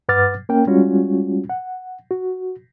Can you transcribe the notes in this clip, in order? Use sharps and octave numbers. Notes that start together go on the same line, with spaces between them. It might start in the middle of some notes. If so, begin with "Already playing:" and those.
G2 B4 F#5 D6 F6 A6
A#3 C#4 A#4 G5
G3 G#3 C#4 F4 F#4
F#5
F#4